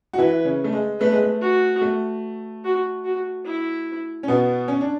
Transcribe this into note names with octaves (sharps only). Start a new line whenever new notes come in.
F#4
E3 E4 B4
C#3 C#4
A3
G#3
A3 B4
G#3
A3
F#4
A3
F#4
F#4
E4
C#4
B2 B3
C#4
D4